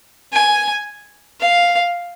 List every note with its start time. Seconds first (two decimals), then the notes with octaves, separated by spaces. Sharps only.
0.33 G#5
1.40 F5